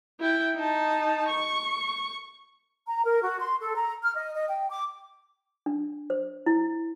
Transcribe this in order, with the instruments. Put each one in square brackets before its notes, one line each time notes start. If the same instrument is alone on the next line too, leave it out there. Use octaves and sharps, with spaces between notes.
[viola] E4 G5
D#4 A5
C#6
[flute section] A#5
A#4
F#4
C6
A4
A#5
F6
D#5
D#5
G5
D6
[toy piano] D4
C5
E4